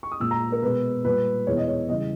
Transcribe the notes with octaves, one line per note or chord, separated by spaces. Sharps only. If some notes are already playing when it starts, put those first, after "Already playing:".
C#6
D#6
A#2 G#3 E6
A#5
A#4
B2 G#3 B4
A#2 G3 B4
E2 B2 G#3 C#5
D#5
C#5
C#3 E3 G3 D#5